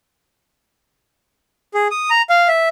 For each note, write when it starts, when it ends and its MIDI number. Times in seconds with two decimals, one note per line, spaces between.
1.74 1.88 68
1.91 2.10 87
2.10 2.22 82
2.30 2.48 77
2.48 2.69 76